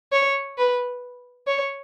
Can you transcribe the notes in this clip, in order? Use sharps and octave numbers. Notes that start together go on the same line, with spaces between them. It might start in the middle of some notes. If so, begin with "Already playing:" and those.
C#5
B4
C#5